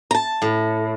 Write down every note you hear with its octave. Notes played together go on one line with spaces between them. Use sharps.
A5 A#5
A2